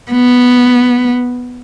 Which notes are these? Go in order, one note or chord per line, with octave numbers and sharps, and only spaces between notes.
B3